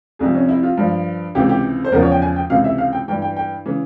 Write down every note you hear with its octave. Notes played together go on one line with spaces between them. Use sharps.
C2 C3 F3 G#4
C#4
E4
F4
G2 F3
C#2 C3 E3 G4
G4
C5
E2 C#3 F3 A#4
C#5
G5
G#5
G5
C#2 C3 E3 F5
E5
F5
G5
G2 E3 G5
G5
G5
C#3 E3